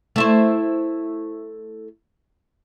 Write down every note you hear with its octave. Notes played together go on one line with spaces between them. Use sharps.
A3 E4 C5